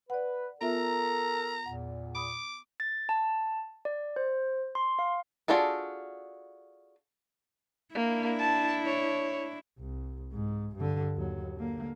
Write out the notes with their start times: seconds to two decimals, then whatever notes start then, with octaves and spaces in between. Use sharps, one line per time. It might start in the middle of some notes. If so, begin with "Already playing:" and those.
0.10 B4 D5 F#5
0.61 B3 F4 A4 A#4 E5 A#5
1.66 E2 A#2 F#5
2.15 B5 D6 D#6
2.80 A6
3.09 A5
3.85 D5
4.16 C5
4.75 C6
4.99 F5
5.48 D4 F4 F#4 G#4 A4
7.95 A#3 D4 E4
8.39 A5
8.86 C#5
9.79 C2
10.33 G#2
10.76 G2 D3
11.15 D#2 F#3
11.56 D3 A#3